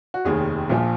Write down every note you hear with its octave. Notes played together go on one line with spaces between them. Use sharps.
F#4
F1 D#2 D#3 G#4
A#1 A#2 F3